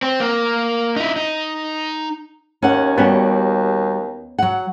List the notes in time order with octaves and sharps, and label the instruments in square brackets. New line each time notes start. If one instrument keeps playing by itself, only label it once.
[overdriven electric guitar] C4
A#3
D#4 E4
D#4
[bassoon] D#2 [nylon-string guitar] C#4 F#5
[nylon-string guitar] G3 F#4 [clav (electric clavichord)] B3 C#4
[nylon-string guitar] F#3 F#5